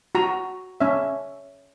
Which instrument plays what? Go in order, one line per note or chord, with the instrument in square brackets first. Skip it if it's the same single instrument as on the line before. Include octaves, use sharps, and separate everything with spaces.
[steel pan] F#4 A#5
C#4 E5